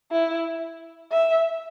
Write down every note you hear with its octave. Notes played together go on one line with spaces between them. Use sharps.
E4
E5